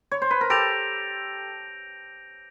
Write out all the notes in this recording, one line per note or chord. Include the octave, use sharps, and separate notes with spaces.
C#5
C5
B4
A#4
G4 A4 G6 A#6 D7 F7